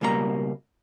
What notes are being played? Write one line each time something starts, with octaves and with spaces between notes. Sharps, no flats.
C#2 B2 G3 A#3 F#4 A#5